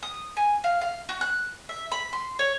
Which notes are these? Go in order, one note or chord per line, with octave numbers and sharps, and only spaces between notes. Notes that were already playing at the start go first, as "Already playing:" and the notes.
D#6
G#5
F5
F5
F#4
F#6
E5
B5
C6
C#5